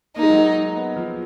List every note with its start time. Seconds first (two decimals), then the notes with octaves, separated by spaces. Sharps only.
0.16 A#3 D#4
0.23 G#3
0.30 F#3
0.38 G#3
0.76 B3
0.97 F3